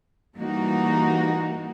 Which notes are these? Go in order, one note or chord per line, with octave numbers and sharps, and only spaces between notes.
E3 G3 A#3 D#4 F#4